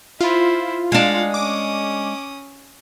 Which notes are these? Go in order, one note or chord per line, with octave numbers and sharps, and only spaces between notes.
E4 F4 C5
G#3 D4 F5 F#5
C#4 D6 D#6